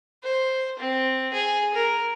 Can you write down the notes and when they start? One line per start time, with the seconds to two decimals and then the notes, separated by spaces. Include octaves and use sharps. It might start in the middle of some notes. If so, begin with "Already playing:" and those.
0.23 C5
0.79 C4
1.33 G#4
1.74 A#4